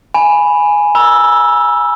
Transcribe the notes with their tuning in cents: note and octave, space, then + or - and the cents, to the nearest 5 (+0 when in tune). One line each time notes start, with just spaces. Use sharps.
G#5 +0 B5 +0
B5 -45 E6 +0